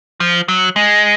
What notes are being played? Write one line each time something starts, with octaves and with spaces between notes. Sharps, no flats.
F3
F#3
G#3